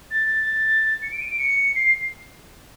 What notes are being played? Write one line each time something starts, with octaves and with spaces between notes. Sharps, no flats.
A6
C#7
D7
D#7
D7
C#7
C7